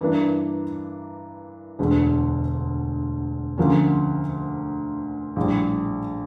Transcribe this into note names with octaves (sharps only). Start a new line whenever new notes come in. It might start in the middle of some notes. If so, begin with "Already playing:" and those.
G2 E3 A#3 D4
E1 D2 D3
D2 D3 F3 A#3 C#4
A#1 A2 G3